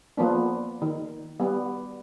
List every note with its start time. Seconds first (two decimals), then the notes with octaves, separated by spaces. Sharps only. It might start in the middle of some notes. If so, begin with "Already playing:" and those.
0.17 F3 A#3 B3 D4
0.82 D#3
1.40 G3 B3